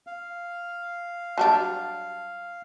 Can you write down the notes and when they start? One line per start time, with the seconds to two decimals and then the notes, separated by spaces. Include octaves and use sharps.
0.07 F5
1.38 F#3 G3 D4 A5